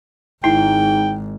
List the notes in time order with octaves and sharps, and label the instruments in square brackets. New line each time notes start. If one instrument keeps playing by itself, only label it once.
[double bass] G#1 [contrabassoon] G#2 [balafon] E4 [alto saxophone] G5